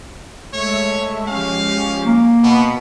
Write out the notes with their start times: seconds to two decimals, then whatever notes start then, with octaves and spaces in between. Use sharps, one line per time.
0.53 G#3 A3 C#5 E5
1.28 F3 G#3 C#4 G4 F5
2.06 A#3
2.43 B2 B3 B6 C#7